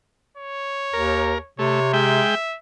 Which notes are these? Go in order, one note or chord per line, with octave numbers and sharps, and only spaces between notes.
C#5
D#2 A#4
C3 A3 C#5
G#3 E5 G5